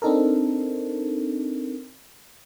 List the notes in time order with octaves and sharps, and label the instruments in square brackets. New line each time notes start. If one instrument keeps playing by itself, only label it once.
[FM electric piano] C4 D4 D#4 A4 A#4